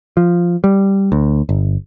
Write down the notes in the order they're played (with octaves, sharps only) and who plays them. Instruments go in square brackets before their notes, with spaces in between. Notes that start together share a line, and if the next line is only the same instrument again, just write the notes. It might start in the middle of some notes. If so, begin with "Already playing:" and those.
[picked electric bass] F3
G3
D2
G1